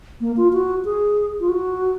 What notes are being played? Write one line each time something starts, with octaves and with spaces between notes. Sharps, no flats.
A#3
F4
F#4
G#4
F4
F#4